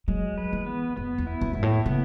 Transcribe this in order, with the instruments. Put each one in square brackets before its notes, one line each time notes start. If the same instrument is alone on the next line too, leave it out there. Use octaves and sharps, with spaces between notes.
[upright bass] F#3 [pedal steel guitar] G#3
[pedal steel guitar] B4
[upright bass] E3
[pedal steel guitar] B3
[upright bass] F#2 [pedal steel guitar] B3
[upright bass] E2
[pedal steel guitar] E4
[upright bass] F#2
[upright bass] G#2 [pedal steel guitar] E4
[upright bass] A2
[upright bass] C#3 [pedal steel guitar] B3